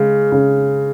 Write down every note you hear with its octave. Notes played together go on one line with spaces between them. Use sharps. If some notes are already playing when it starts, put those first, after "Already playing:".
Already playing: C#3 G#3
C#3